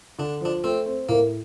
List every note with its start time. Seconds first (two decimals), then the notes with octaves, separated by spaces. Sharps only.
0.18 D3 D4
0.41 F3 D4
0.64 A3 C4
0.86 C4
1.09 A2 A#3